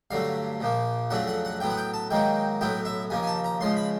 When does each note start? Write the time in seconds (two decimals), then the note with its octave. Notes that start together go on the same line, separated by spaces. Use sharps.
0.11 G2 D3 F#3 A3 F5
0.60 A#1 A#2 F3 A#3
1.10 F2 C#3 F#3 A3 D4 F#5
1.28 F#5
1.45 F#5
1.60 A2 F#3 B3 G5
1.70 F#5
1.77 G5
1.94 A5
2.11 G#2 D#3 F#3 A#3 D#4 G5
2.61 B1 A2 F#3 B3 E4 G5
2.85 E5
3.10 D#2 C#3 F3 A#3 G#5
3.23 G#5
3.27 A5
3.44 A#5
3.60 C#2 C#3 F3 G#3 C6
3.77 B5